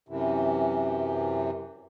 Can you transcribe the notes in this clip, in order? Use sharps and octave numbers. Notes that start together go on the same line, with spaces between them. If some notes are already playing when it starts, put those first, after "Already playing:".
F#2 C3 E3